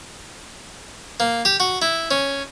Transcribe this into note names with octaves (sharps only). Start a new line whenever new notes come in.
A#3
G4
F#4
E4
C#4